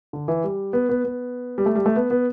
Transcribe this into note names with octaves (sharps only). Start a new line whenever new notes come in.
D3
E3
G3
B3
B3
B3
G3
A3
G3
A3
B3
B3